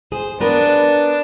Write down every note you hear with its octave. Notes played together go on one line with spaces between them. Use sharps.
G#4 C5
B3 D4 A#4 B4